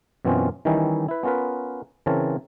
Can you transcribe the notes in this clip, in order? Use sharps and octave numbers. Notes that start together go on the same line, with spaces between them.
F#2 B2 E3 C4 C#4 F4
D#3 E3 G3 C#4 D#4 E4
E4 B4
B3 C#4 F4 A#4 B4
C#3 E3 C4 A#4 C#5 A5